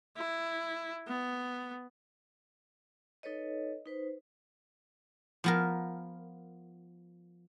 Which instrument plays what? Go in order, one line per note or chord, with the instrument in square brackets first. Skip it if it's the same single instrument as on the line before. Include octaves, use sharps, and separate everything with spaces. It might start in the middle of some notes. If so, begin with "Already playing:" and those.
[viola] E4
B3
[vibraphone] D#4 A4 B4 C#5 D#5
D#4 B4 C5
[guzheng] F3 B3 A#4